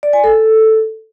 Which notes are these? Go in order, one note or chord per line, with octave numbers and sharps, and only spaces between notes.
D5
G#5
A4